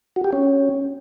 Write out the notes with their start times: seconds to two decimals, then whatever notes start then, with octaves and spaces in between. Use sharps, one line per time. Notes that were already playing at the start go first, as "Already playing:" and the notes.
0.16 F#4
0.24 G4
0.33 C#4